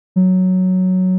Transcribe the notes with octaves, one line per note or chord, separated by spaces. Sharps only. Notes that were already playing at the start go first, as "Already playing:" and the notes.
F#3